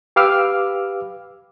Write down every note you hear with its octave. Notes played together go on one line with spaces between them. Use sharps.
G4 B4 F5 D6 E6 F6